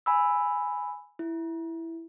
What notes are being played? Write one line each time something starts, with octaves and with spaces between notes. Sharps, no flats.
G#5 B5 E6
E4